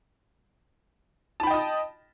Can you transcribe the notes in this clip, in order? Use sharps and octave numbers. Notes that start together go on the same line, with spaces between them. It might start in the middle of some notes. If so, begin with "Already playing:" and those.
D#5 G5 A5 B5 D#6